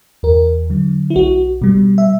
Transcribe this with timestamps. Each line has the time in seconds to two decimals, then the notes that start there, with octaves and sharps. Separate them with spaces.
0.23 E2 A#4
0.70 D3 F#3
1.10 E4
1.16 B1 F#4
1.62 B2 G3
1.98 E5